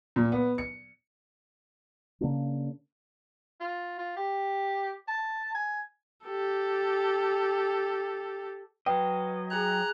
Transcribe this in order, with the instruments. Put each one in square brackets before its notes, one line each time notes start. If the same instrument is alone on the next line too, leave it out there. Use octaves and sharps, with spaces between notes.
[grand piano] A#2
B3
C#7
[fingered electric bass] C#3 A#3 D4
[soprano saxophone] F4
F4
G4
A5
G#5
[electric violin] G4 A4
[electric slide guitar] F#3 D#5 [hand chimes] B4 [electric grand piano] G5
[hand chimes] G#4 G#5 G#6 [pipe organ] A#5 F#6